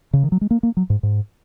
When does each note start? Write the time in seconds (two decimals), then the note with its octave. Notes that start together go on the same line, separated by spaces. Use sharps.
0.13 C#3
0.23 D#3
0.32 F#3
0.41 G#3
0.51 A#3
0.63 A#3
0.77 F#3
0.90 G#2
1.03 G#2